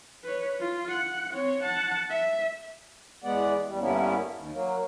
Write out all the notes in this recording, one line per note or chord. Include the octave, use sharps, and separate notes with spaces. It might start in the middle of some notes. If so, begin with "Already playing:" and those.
B4 C#5
F4
F#5
C4 C#5
F#5 A5
E5
E2 G#3 B3 D5 F#5
E2 G3
G2 D3 A#3 B3 C#4 E4
D#2
F#3 A#3